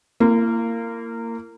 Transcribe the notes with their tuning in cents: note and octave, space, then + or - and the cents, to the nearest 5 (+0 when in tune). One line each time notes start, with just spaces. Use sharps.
A#3 -20 E4 +40